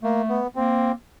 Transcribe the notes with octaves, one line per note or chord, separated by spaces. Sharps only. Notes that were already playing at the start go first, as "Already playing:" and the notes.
A3 A#3
B3
A#3 C4